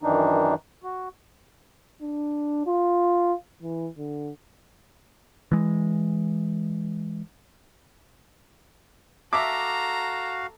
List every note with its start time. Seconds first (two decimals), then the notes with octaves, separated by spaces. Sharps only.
0.03 F#2 D#3 E3 D4 D#4
0.84 F#4
2.02 D4
2.67 F4
3.62 E3
3.98 D3
5.51 E3 G#3
9.33 F#4 A4 E5 F5 A5 A#5 D6